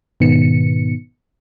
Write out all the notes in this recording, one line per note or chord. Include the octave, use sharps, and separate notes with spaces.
G#2 B2 D#3 B3 C#7